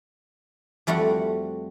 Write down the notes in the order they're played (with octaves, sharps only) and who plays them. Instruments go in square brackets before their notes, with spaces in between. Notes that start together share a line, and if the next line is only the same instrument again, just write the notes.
[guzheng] F2 G3 A3 F#4 F#5